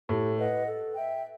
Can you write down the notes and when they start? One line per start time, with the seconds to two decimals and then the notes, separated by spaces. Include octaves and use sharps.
0.09 A2 A3 G4
0.38 B4 D#5 F#5
0.66 A4
0.94 E5 G5